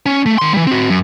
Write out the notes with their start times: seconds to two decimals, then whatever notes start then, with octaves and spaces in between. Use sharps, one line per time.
0.06 C#4
0.26 A3
0.38 D#3 C6
0.54 E3 G3
0.67 C4 F#4
0.90 F#2